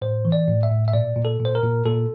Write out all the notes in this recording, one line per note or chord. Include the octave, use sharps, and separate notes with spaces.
A2 C5
E3
D5
A2
E5
A2
E5
A#2 D5
A#2
A4
A#2
C5
A#4
A#2
A#2 A4